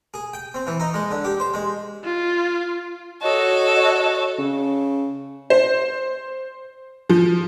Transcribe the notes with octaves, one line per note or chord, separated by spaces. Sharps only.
G#4
G5
C4
E3
D#4
G#3
D3
G4
C5
G#3
F4
F#4 A4 C#5 D#5
C#3
C5
F3